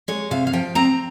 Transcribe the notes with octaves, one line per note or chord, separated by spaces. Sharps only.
G#3 C#5
C3 F5
F5
F3 G5
C4 A#5